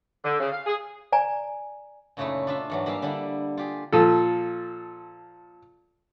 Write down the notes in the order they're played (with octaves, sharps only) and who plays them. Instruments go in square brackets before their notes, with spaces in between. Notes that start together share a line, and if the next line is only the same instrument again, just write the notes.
[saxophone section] D3
C#3
F5
G#4
[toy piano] D5 G#5 A#5
[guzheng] F#2 A#2 C#3 A3 D#4 E4
D4 F4 E5
G#2 E3 F#3
G3 A#3 G#4 E5 F5
D3 G3 D4 E4
F4 G4 G#4
[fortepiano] A#2 F3 A4